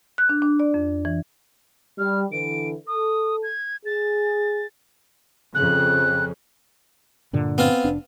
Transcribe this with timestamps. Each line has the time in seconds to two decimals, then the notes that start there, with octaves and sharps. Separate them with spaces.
0.18 F#6
0.29 D4
0.42 D4
0.60 D5
0.74 F2
1.05 E3
1.99 G3 F6
2.32 D3 E3 D7
2.87 A4 D#6
3.43 G#6
3.86 G#4 A6
5.54 F2 C#3 F#6
7.33 G2 A#2 D3
7.58 B3 C4 F4
7.84 F1 D4